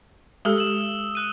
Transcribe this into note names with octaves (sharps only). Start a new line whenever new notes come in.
G#3 G4 A4 D#6 E6 G7
E7 F#7
E6 F#6 D#7